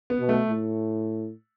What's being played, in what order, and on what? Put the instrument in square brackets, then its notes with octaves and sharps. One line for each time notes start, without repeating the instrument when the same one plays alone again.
[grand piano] B3
[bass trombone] B2
[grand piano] A3
[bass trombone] A2